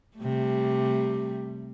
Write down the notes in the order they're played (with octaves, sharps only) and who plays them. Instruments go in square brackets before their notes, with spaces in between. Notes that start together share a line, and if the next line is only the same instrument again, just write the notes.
[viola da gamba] C3 G3 A3